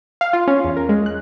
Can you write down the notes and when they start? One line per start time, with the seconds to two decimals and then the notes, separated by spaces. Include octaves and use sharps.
0.21 F5
0.33 F4
0.47 C#4
0.64 E2
0.77 A#4
0.89 G#3
1.06 F#6